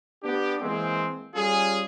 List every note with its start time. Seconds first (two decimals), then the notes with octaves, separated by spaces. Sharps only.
0.24 B3 D4 G4
0.61 E3 G#3 A#3 C4
1.35 G3 C#4 F4 G#4